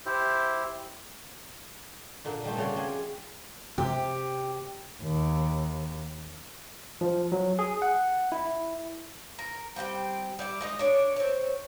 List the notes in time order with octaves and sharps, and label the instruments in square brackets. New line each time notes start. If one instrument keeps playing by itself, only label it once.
[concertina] E4 G4 C5
[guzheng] A#2 D3 A#3
D3 G3 A3 C4
C#3 C#4 F#4 C#5 D5 C6
F3 C4 F#5 G#5 C6
[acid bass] C3 [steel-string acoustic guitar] G4
[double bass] D#2
[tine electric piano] F3
F#3
G#4
F#5
E4
[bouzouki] A#4
G3 C4 F#5 G5
G3 D5 E5
G#3 D#4 D#5
D4 C#5 D5
C4 C#5